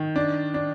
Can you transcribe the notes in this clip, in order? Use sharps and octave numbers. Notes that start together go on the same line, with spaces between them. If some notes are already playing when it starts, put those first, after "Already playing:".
Already playing: D#3
D4
D4